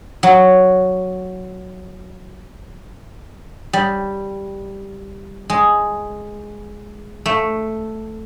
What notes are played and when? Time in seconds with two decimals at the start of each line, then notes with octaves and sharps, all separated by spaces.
0.23 F#3
3.73 G3
5.50 G#3
7.26 A3